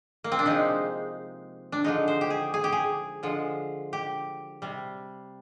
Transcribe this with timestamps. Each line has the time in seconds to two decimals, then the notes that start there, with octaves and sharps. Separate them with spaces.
0.24 A#3
0.32 C4
0.39 D4
0.46 C3 F3 G#3 D#4
1.72 D4
1.84 D3 F3 G#3 D#4
2.08 C5
2.21 G4
2.30 G#4
2.54 G#4
2.64 G4
2.72 G#4
3.23 D3 F3 G#3
3.93 G4
4.62 C3 G3